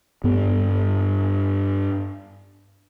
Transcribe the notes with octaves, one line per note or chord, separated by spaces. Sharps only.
G2 B3